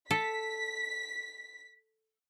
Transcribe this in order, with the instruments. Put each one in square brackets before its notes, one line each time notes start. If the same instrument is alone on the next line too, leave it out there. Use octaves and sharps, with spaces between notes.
[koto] A4 [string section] B6